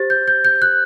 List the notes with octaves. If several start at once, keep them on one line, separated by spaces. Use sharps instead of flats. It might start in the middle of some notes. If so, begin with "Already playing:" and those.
Already playing: G4 C5 A6
G6
G6
G6
F#6